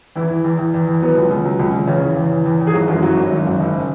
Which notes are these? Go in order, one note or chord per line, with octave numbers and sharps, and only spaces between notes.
E2 E3 E4
E3
E2
E2
E2
E2
F#3 B3
C#2
C#2
F#3
C#2
C#2
E2 C#3 C#4
E2
E2
E2
E2
E2
G#4
G#1 F#3 F#4
F#2 E3 E4
F#3 F#4
G#1
F#2
G#1
F#1